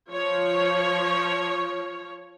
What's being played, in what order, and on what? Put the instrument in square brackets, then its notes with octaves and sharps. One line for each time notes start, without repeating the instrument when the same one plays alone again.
[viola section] F3 C#5